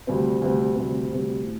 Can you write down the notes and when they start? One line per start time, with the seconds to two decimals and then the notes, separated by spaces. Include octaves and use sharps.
0.07 D2 C3 G3 C4
0.42 D2 C3 G3 C4
0.75 D2 C3 G3 C4
1.11 D2 C3 G3 C4
1.45 A2